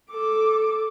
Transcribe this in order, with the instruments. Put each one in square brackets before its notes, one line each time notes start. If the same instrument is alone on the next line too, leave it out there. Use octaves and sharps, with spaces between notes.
[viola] A4 D6